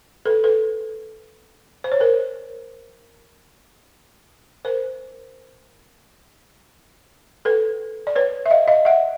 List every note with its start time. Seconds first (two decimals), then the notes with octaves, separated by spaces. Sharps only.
0.26 A4 B4
0.44 A4 B4
1.84 C5
1.92 C#5
2.00 A#4 C5
4.65 A#4 C5
7.45 A4 B4
8.07 D5
8.16 B4 C#5
8.46 E5
8.50 D#5 F5
8.68 D#5 F5
8.85 E5 F#5